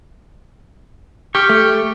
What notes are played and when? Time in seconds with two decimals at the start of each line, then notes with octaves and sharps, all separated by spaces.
1.35 G4 C#6 F6
1.49 A3